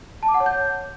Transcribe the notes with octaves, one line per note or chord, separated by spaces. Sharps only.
A5
D6
F#5
C#5
G6